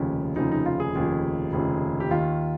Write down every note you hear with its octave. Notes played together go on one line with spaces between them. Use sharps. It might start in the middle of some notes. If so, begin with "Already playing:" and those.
Already playing: F1 D#2 C#3 F3
F1 D#2 C#3 F3 D#4
D#4
F4
G#4
F1 D#2 C#3 F3
F1 D#2 C#3 F3
G4
D#2 D#3 F4